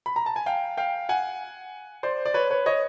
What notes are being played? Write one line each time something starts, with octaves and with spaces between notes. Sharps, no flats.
B5
A#5
A5
G#5
F5 G5
F5 G5
F#5 G#5
C5 D5
D5
B4 C#5
B4 C#5
C#5 D#5